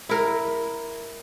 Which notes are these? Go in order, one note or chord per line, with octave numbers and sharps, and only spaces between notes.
E4 A#4